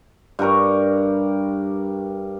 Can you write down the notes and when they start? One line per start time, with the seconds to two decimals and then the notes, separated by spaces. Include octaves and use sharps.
0.39 G2 G3 A#4 C#6